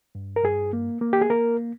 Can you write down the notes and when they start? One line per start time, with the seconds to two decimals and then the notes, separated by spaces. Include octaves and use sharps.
0.15 G2
0.36 A#4
0.43 G2 G#4
0.73 A#3
1.01 A#3
1.13 G4
1.21 G#4
1.30 A#3 A#4